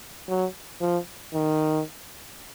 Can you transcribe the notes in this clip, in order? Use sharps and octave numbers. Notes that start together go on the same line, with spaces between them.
F#3
F3
D#3